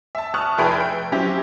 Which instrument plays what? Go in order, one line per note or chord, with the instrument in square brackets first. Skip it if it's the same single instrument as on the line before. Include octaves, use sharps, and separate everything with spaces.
[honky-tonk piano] E5 A5
A5 C#6 D#6 F6 F#6
F1 E4 G#4 B4 G5 B5
G5
F#3 C4 C#4 E4 G4